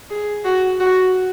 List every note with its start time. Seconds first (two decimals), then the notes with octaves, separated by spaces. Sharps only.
0.10 G#4
0.45 F#4
0.80 F#4